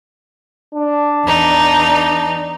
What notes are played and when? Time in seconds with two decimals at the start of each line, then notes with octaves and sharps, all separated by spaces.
0.74 D4
1.26 E2 D#4